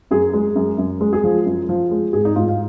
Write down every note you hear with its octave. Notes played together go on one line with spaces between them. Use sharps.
F#2 G#4
G#3
F#2
F#2
G#3
G#4
F3
F#2
F3
G#3
G#2 G#4
D#4
G#2 F4
F5